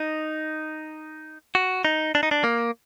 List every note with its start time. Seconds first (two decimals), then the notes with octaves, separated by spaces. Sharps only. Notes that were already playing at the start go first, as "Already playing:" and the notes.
Already playing: D#4
1.55 F#4
1.85 D#4
2.15 D4
2.23 D#4
2.31 D4
2.44 A#3